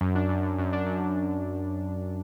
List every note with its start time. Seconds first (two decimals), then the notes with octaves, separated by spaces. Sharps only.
0.01 F#2
0.15 D4
0.29 F#2
0.43 F#2
0.59 F#2
0.73 D4
0.86 F#2